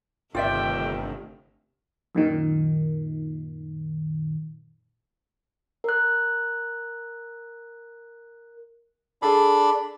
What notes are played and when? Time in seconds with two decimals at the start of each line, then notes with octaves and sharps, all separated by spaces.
0.35 G1 C3 D#3 A3 F4 D5 E5 G5
2.15 F#2 A#2 D#3
5.84 A#4 F#6
9.22 D4 G#4 A4 D5 B5